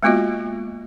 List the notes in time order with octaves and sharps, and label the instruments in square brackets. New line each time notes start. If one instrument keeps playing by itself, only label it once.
[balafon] G#3 A#3 B3 F4 F#4 D#5